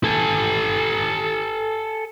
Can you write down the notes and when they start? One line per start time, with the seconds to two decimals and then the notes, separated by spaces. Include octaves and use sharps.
0.04 A4 G#5